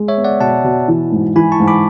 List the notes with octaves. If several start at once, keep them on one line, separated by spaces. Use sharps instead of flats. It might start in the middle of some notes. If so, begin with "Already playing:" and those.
Already playing: G#3
C#5 E5
B3
D5 F#5
B2 F#5 A5
B2
E3
G#2
E3 G#5 B5
A5 C#6
G#2
B5 D6